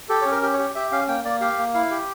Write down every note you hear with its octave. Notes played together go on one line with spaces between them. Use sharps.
G4 A4
C#4 C#5
A#4
G4
C#5
G4
G4 E5
C#4 F5
A#3 G5
A#3 D5
G4 F5
A#3
E4 F5
G4